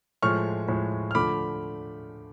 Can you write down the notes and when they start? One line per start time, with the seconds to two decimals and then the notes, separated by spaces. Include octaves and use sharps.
0.22 A2 F3 G#3 C#6 F6
0.68 A2 F3 G#3
1.11 F6
1.15 D3 F3 A3 B5 D6